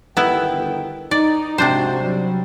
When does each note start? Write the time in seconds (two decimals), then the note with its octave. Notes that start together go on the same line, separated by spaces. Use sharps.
0.17 G1 D#3 B3 E4 G5
1.11 D#4 D5
1.58 G#2 C3 D4 F#4 C5
2.01 F#3 G3